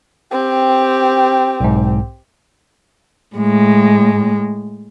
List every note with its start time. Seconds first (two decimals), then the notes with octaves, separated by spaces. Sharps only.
0.32 C4 G4
1.60 B1 G#2
3.36 A2 G#3